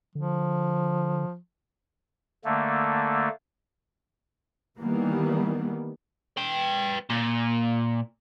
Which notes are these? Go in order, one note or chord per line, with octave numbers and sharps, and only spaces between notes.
D3 F3
D3 A3 A#3
D#3 E3 G3 A#3 B3
B4 G5
A#2